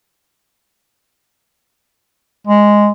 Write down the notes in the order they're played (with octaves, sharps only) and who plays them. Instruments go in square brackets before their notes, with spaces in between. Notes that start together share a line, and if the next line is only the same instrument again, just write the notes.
[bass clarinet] G#3